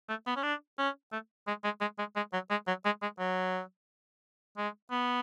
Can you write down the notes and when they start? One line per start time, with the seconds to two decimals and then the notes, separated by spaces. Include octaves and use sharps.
0.09 A3
0.27 B3
0.36 C#4
0.43 D4
0.78 C#4
1.12 A3
1.48 G#3
1.64 G#3
1.81 G#3
1.99 G#3
2.16 G#3
2.33 F#3
2.51 G#3
2.67 F#3
2.85 G#3
3.02 G#3
3.19 F#3
4.58 G#3
4.91 B3